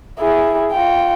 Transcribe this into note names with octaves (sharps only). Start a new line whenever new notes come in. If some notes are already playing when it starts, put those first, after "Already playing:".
E4 G#4
F4 G5